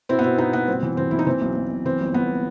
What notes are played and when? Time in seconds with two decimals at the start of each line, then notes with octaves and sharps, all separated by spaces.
0.09 B2 C4 E4
0.19 B3
0.24 B2 C4
0.38 B2 B3 D#4
0.53 B2 B3
0.68 G1 C4
0.83 E3
0.97 E3 C4
1.11 E3 E4
1.19 D#4
1.27 E3 C4
1.41 B1
1.56 B1
1.71 B1
1.85 E3 C4
2.00 G1
2.14 G1 B3